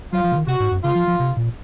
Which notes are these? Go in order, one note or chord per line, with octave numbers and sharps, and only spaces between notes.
F#3 F4
F3
C#3
D#3
C3 F#4
G#2
F#2
C#3 F4
F3
F3
C3
A#2